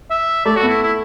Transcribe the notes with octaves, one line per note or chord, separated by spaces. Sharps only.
E5
A3 D5
F#4
B3
E4
E4